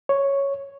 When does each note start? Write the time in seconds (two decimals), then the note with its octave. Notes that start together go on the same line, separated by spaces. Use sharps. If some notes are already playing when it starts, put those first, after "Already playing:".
0.09 C#5